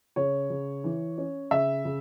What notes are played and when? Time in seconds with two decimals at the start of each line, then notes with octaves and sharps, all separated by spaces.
0.16 C#3 C#5
0.50 C#3
0.84 E3
1.18 C#4
1.51 C#3 E5
1.85 C#3